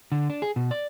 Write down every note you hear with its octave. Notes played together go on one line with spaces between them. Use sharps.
D3
D4
G#4
B2
D5